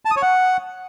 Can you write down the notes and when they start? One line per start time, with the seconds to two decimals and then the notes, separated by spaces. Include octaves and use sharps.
0.05 A5
0.11 D#6
0.16 C#5
0.22 F#5